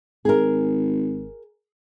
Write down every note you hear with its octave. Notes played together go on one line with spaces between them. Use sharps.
G#1 G#4 A#4